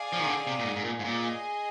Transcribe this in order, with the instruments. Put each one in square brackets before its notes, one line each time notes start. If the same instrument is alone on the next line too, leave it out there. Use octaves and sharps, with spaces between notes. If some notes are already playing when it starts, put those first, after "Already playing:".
Already playing: [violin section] G#4 D5 F5 G#5
[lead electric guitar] F3
D#3
D3
C3
A#2
G#2
G#2
A#2
G#2
[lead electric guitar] A#2 [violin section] G#4 D#5 G#5